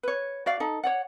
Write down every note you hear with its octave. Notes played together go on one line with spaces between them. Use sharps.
B4 C#5
F#4 D5 F5
D#4 A4
C#5 D5 F#5